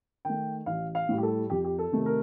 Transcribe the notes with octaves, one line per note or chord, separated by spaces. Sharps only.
D#3 A3 G5
A1 F5
F5
A2 G3
G4
A4
F2 G4
G4
A4
C3 D#3 A3
A#4